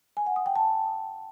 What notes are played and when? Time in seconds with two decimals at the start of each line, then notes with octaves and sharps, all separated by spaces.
0.17 G#5
0.26 F#5
0.36 D#6
0.46 G5
0.56 A5